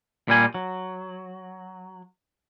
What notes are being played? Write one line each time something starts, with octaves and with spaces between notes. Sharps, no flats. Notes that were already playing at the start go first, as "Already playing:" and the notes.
A#2 G3 G#5
F#3